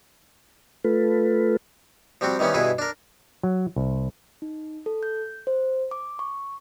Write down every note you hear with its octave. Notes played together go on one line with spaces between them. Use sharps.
A3 F4 A4 B4
F3 G3 C4 F#4
D#3 E3 G3 B3 C#4
G2 B2 E4 G#4 B4
D4 A#4
F#3
C2
D#4
A4
G6
C5
D6
C#6